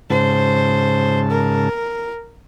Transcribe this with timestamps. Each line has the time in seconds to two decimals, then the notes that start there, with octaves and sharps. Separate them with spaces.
0.10 G#2 C#3 C5 A5
1.31 A#4